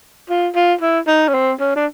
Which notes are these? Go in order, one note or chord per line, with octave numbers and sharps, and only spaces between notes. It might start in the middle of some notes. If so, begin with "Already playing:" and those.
F4
F4
E4
D#4
C#4
C4
C#4
D4